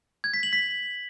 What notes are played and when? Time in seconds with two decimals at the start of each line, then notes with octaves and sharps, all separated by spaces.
0.24 G#6
0.34 B6
0.43 F#7
0.53 B6